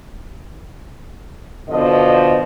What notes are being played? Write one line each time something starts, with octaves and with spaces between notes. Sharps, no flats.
B2 D3 F3 D#5